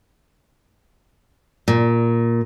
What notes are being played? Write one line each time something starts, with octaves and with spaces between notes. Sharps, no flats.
A#2